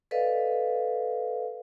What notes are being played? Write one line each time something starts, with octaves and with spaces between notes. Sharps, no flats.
A4 B4 D5 D#5 F5